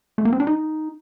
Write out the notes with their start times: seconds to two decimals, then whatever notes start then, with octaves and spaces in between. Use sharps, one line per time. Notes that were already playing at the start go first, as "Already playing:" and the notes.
0.18 A3
0.25 A#3
0.33 C4
0.40 D4
0.47 D#4